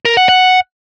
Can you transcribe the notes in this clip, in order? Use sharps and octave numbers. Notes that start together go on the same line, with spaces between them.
A#4
F#5
F#5